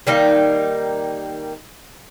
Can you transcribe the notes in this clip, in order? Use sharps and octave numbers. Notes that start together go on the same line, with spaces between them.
D#3 G3 A#3 D#4